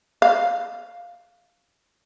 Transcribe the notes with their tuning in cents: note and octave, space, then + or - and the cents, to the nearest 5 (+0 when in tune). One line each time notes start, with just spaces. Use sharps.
F5 +5